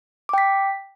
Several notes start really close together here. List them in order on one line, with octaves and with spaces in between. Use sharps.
D6 G5 B6